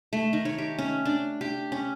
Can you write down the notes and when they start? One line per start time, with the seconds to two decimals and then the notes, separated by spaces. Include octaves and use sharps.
0.13 A3
0.33 D#3
0.45 C#5
0.58 G4
0.79 C#4
1.05 D4
1.41 G4
1.72 C#4